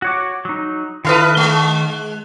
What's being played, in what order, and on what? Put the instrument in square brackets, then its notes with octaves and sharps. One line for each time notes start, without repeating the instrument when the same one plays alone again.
[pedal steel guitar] F#4 C#5 D6
F#3 D#4
[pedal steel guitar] D#3 F5 D#6 [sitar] E4 A4 B4
[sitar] G#3